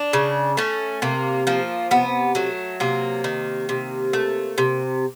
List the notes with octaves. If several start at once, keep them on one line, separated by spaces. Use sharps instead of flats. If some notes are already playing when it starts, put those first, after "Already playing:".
Already playing: D4
C#3
A3 C#4
C3 A#3
F3 A#3
C3 B3
F#3 A3
C3 A#3
D#3
C3
A3
C3